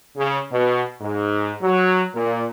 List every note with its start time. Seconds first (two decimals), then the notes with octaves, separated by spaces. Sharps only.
0.16 C#3
0.51 B2
1.01 G#2
1.62 F#3
2.15 A#2